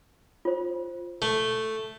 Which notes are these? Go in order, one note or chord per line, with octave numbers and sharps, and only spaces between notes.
F4 C5
A3